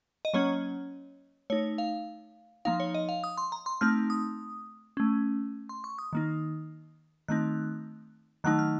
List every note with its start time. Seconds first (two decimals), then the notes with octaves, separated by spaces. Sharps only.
0.25 D#5
0.34 F#3 A#3 C#4 C#5
1.50 A3 D#4 C#5
1.78 F5
2.65 F3 A#3 D#4 F5
2.80 C#5
2.94 D#5
3.09 F5
3.24 D#6
3.38 C6
3.52 A#5
3.66 C6
3.81 A3 C4 D#4 F6
4.10 D#6
4.97 A3 C#4
5.69 C6
5.84 C#6
5.98 D#6
6.13 D#3 A#3 D#4
7.28 D#3 A3 C4 D#4 F#6
8.44 D#3 F#3 A3 D#4 F#6
8.59 F6